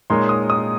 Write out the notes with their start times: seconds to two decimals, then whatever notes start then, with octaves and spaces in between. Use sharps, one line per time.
0.10 A#2 G#3 D#4 A#4 C#5 C6
0.29 D#6
0.50 D#6